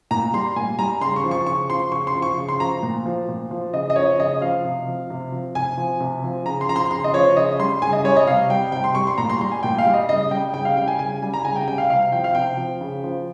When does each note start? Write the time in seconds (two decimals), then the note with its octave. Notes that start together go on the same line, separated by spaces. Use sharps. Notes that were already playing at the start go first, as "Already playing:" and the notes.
0.11 A#2 A#5
0.34 G3 C6
0.56 A#2 G#5
0.79 G3 A#5
1.01 C#3 C6
1.16 C#6
1.24 F3
1.31 C#6
1.47 C#3 C#6
1.69 F3 C6
1.92 C#3 C#6
2.07 C6
2.15 F3
2.22 C#6
2.38 C#3
2.49 C6
2.60 F3 A#5
2.83 A#2
3.06 F3
3.28 A#2
3.51 F3
3.73 C#3 D#5
3.90 D#5
3.96 F3 C#5
4.19 C#3 D#5
4.41 F3 F5
4.65 C3
4.87 F3
5.10 C3
5.32 F3
5.55 C3 G#5
5.78 F3
6.00 C3
6.24 F3
6.46 C#3 A#5
6.61 C6
6.69 F3 A#5
6.76 C6
6.91 C#3 C6
7.04 D#5
7.14 F3 C#5
7.37 C#3 D#5
7.59 G3 C6
7.82 C#3 G#5
7.93 D#5
8.04 G3 C#5
8.16 D#5
8.27 C3 F5
8.50 G3 G5
8.72 C3 G5
8.84 C6
8.95 G3 C#6
9.07 C6
9.18 A#2 A#5
9.30 C6
9.41 G3 C6
9.52 G#5
9.63 A#2 G5
9.78 F5
9.86 G3
9.94 D#5
10.09 C#3 D#5
10.31 G3 G5
10.54 C#3 G5
10.65 F5
10.77 G3 G5
10.88 G#5
10.99 C#3 G#5
11.22 G3 G#5
11.34 A#5
11.44 C#3 G#5
11.56 G5
11.67 G3 G5
11.78 F5
11.90 C3 F5
12.12 F3 G5
12.24 F5
12.35 C3 G5
12.57 F3
12.81 C#3
13.04 F3